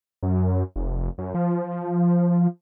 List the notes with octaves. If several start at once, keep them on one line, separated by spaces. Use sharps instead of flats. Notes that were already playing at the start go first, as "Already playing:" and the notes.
F#2
F1
F#2
F3